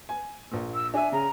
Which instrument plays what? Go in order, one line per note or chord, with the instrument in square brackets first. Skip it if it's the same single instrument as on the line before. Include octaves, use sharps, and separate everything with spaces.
[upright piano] G#5
A#1 A#2
[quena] E6
[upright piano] D4 E5 [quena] G#5
[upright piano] C#3 [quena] A#5